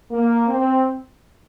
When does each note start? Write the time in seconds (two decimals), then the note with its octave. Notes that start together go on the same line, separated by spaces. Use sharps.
0.11 A#3
0.48 C4